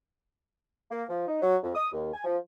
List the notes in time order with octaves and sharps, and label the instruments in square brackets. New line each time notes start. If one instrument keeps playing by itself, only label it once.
[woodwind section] A#3
F3
D#4
F#3
F2
D#6
D#2
G#5
F3